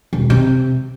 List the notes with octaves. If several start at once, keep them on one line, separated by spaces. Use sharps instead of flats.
E1
C3